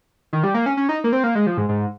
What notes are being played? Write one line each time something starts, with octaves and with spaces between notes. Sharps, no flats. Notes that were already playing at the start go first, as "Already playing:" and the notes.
D#3
G3
A#3
C#4
C#4
D#4
A#3
C4
A#3
G#3
F3
G#2
G#2